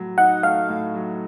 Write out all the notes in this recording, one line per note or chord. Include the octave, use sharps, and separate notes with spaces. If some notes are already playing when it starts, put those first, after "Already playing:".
Already playing: A2 F#3
D#4 F#5
A3 F5
A2
F#3